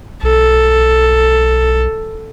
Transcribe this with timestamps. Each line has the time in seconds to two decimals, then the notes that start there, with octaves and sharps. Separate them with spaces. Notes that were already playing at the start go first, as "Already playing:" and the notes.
0.23 B1 A4